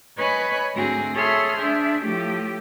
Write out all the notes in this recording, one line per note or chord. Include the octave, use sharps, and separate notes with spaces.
B4 C#5 D#5 G#5 B5 F#6
D2 G#2 C4 F#4 G#4 A#6
G#4 A4 C#5 E5 C6 F6
D4 G#4 C5 E5
A2 F3 A3 G4